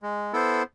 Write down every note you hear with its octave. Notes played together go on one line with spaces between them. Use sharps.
G#3
B3 E4 A4 C5